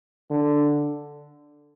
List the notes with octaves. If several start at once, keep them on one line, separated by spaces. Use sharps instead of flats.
D3